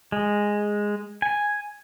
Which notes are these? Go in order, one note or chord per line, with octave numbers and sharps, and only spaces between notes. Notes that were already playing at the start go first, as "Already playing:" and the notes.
G#3
G#5